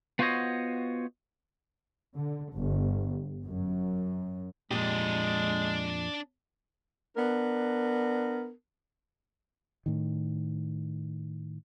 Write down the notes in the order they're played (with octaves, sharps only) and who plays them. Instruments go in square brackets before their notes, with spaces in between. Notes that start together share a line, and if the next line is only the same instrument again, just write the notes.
[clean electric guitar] B3 F4 F#4 C5 C#5 D#5
[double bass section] D3
G1
F#2
[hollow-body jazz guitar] F2 A#2 G4 [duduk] G#3 [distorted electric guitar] D4 D#5
[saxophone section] B3 D4 A#4
[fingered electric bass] A2 D#3